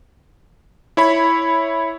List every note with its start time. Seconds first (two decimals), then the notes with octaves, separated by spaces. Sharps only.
0.97 E4 C#5 B5